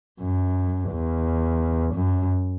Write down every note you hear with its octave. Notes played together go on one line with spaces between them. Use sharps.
F#2
E2
F#2